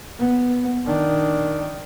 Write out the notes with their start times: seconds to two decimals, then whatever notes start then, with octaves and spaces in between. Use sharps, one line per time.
0.19 B3
0.86 D#3 D4